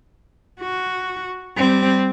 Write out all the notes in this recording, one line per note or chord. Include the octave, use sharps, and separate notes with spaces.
F#4
G3 C4